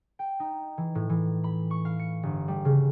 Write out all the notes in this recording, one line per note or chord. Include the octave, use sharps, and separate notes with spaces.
G5
D#4
E3
A2
E3
B5
C#6
F5
C#7
G1
G3
C#3